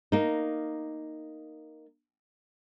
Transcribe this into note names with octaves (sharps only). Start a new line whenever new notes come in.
A#3 D#4